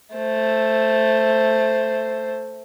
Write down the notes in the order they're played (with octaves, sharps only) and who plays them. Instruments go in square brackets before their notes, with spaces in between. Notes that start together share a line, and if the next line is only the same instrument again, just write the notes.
[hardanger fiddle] A3 C5